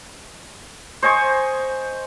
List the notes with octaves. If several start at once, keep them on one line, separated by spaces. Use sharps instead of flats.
C5 D#5 G#5 C#6